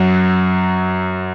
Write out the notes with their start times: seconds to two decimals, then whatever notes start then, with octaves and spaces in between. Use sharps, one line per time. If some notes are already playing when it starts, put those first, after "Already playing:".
Already playing: F#2 F#3